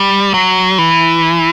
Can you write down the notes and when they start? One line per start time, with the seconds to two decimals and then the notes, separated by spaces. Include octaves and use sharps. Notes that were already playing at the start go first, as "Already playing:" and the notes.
Already playing: G3
0.34 F#3
0.78 E3